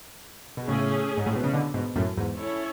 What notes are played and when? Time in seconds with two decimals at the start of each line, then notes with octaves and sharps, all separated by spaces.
0.57 B2
0.68 A2 C#3 A3 C#4 G#4
1.17 G#2
1.26 A2
1.36 B2
1.44 C#3
1.53 B2 D3
1.74 G#2 B2
1.96 F#2 A2
2.17 E2 G#2
2.38 C#4 E4 A4 C#5